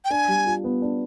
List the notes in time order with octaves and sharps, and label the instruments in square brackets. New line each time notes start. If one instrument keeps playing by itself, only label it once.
[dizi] G5
[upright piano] D4 [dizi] G#5
[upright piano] G3
F4
B3
D4